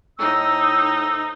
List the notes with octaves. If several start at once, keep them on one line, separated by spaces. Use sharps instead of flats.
A2 D#4 C5 E6